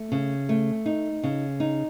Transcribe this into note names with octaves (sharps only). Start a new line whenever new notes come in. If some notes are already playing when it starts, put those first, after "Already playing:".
Already playing: A3
C#3
A3
D#4
C#3
D#4